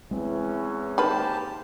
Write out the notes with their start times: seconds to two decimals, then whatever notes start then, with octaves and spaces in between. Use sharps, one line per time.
0.11 E2 E3 G#3 C4 C#4
0.98 D#3 A#3 G4 B4 C5 A5